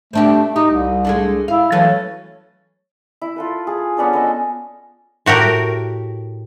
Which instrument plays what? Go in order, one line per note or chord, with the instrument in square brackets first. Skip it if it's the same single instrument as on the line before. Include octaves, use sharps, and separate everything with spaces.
[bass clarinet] A3 [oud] C4 D4 G4
[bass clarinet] D#4 [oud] G4
[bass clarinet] C2
[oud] G#3 A3 D4
[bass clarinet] E4 [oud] F5
[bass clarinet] E3 [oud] F#3 A3 C#4
[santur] E4
F4 A4 B4
G#4
B3 C#4 D4 A4
B3 A4 D#5
[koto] A2 F#4 G4 A#4